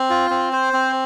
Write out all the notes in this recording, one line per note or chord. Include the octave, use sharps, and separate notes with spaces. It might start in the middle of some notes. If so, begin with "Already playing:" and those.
Already playing: C4
F4
C4
C5
C4